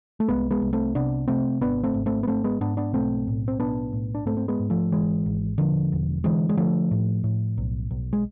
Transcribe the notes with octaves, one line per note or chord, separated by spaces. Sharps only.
A3
C2 G#3 B3
G#3 B3
C2
A3 C4
C3 B3 D4
C3 A3 C4
G#1 B3 D4
A3 C4
G#1
A3 C4
B3
G#1 A3 C4
G#3 B3
G#2 B3 D4
B3 D4
B1 A3 C4
A2
C4
B1 B3 D4
A2
D4
G#2 A3 C4
C4
G#3 B3
G#2
F3 A3
G#1 E3 G#3
G#1
E1 D3 F3
E1
D3 E3 G#3
G#3
D3 F3 A3
A2
A2
B1
B1
G#3